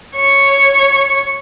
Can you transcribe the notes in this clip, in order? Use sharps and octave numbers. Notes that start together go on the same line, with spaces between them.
C#5 C#6